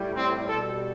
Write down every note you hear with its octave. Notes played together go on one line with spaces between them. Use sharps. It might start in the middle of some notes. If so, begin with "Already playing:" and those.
Already playing: A2 G3
C4
B2 G3 A4